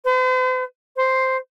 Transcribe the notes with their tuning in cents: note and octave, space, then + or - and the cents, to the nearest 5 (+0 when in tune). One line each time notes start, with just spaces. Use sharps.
C5 -45
C5 +0